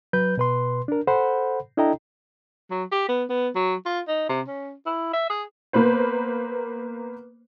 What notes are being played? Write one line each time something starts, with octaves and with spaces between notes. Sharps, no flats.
F#3 B4 G6
B2 B4 C6
D4 A#4
A4 C5 F#5 B5
D4 E4 A4 D#5 G5 A#5
F#3
G4
B3
B3
F#3
F4
D#4
C3
C#4
E4
E5
G#4
A#3 B3 B4 C5